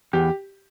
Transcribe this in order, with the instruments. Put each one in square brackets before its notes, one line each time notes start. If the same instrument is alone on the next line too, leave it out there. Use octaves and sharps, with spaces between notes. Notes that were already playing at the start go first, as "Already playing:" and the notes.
[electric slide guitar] E2 [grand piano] G4